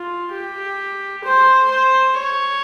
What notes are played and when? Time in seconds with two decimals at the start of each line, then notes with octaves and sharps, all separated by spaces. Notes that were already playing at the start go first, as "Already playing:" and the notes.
Already playing: F4
0.33 G4
1.24 C5
1.71 C5
2.17 C#5